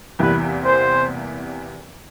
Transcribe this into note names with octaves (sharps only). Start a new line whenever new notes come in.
E2 C3 E3 G3 A#3 B4
C5